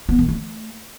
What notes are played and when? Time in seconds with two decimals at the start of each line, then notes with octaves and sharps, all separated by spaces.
0.09 B3
0.19 D#3
0.28 A3